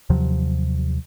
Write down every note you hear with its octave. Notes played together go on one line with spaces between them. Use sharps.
D#2 C3 F3 F#3